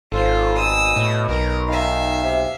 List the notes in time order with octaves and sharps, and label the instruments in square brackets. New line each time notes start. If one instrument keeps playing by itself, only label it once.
[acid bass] G#1 [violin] F4 C5 [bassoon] A4
[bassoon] B2 [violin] D#6 E6
[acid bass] A2
[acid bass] B1 [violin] A#4
[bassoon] D#3 [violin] E5 F5
[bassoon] C3